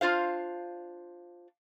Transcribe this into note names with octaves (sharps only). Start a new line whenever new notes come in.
D4 F4 C5 F5